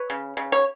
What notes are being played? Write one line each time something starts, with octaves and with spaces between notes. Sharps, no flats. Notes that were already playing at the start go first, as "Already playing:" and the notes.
Already playing: B4 C#5
C#3
C#3
C#5